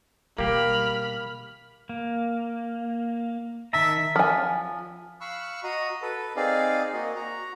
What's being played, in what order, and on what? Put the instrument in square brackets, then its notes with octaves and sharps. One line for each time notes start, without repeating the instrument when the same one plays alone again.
[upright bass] B2 G3 [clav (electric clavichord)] A#3 G4 [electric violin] B5 F6
[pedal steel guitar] A#3
[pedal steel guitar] D#3 A5 A#5 [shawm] E5
[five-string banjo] F3 G#5
[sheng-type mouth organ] F5 B5 C#6 E6 F#6
F#4 D#5 A#5 D#6
A4 B4
C4 D#4 G#4 D5 F5
A#3 F#4 D#5
F#4 A#5